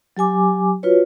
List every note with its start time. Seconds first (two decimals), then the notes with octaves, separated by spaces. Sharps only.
0.17 F#3 G4 G#5 D6
0.83 F4 F#4 B4 C#5